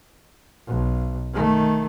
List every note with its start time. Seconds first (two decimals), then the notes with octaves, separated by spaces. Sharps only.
0.67 B1
1.33 D#3 A3